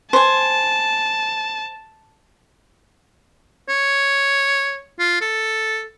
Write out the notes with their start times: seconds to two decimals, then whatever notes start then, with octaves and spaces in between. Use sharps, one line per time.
0.13 C5 G#5 A5
3.69 C#5
4.99 F4
5.21 A4